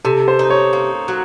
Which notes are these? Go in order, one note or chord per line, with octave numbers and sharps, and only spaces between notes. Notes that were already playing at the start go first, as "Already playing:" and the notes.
C3 A4
C5
D#4
C#5
A#3
F#3